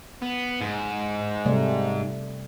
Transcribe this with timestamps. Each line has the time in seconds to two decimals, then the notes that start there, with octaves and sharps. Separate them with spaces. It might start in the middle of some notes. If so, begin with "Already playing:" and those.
0.22 B3
0.61 G#2
1.45 C3 G3 A3